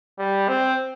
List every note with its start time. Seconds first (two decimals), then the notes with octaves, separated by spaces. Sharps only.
0.18 G3
0.48 C4